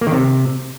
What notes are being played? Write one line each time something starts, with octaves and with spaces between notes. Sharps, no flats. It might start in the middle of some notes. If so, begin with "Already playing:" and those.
A#3
D#3
C3